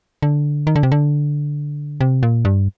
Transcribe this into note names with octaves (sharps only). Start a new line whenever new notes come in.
D3
D#3
D3
C3
D3
C3
A#2
G2